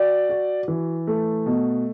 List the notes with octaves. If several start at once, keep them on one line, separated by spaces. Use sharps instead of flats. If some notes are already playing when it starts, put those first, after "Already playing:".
Already playing: F#4 D5
F#4
E3
A3
B2